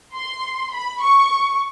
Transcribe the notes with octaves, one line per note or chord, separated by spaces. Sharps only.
C6
B5
C#6